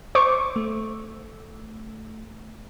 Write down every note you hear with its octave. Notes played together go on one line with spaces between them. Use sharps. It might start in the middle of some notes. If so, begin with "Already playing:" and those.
C5 C#6 D6
A3